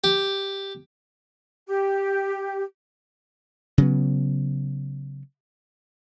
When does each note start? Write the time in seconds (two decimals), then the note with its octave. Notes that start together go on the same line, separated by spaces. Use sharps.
0.04 G4
1.67 G4
3.78 C#3 F#3 B3